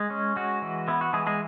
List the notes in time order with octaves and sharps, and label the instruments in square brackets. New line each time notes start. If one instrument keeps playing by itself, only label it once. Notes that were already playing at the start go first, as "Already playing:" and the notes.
Already playing: [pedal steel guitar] G#3 G#4
C#4
G#3 F#4
E3
B3 E4
F#4
E3 G#3 G#4
G#3 G#4